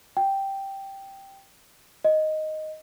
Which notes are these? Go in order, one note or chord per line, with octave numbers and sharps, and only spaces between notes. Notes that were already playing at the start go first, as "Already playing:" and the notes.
G5
D#5